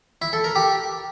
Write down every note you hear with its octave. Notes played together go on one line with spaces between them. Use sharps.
E4
A4
A#4
G4